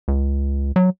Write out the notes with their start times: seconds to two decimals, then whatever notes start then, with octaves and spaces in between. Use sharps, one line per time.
0.08 C#2
0.76 F#3